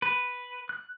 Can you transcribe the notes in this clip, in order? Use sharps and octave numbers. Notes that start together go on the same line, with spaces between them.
B4
F#6